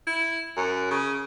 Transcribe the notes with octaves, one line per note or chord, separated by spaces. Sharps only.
E4
F#2
C#3